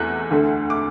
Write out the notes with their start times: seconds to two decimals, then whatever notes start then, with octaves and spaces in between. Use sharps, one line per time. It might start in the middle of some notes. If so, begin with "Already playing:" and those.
Already playing: E2 A3 F#6
0.31 D2 D3 A3
0.70 D6